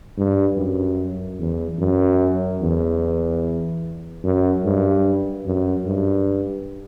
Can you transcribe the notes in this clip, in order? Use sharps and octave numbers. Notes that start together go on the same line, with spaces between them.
G2
F#2
E2
F#2
E2
F#2
G2
F#2
G2